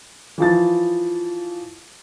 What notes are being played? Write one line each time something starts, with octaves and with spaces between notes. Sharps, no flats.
E3 F3 A6